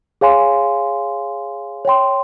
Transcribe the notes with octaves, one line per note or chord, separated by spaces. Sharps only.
G#4 C#5 F5 G#5 C6
C#5 G5 C6